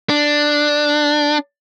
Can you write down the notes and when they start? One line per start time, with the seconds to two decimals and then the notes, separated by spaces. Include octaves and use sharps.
0.10 D4